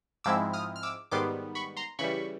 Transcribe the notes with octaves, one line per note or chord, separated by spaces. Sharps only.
G#2 F3 G#3 C4 E4 D6 E6
D#6 F6
F6
D6 E6
G#2 D#3 G3 B3 C6 D6
B5 C#6
A#5 C6
C#3 E3 G3 B5 C#6